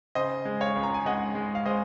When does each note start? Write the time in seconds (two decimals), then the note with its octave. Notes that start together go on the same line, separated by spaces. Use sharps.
0.15 C#3 C5 D#5
0.45 G#3
0.60 C#5 F5
0.76 C#2
0.83 A#5
0.94 G#5
1.05 G#3 D#5 F#5
1.35 G#3
1.55 F5
1.66 G#3 C5 D#5